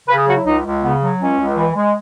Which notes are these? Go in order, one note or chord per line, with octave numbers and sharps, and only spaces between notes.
C#3 B4
G#4
F#3 F#4
E4
C#2 D#4
C#2
C#3 B3
F#3
C#2 C#4
C#2
E3
G#3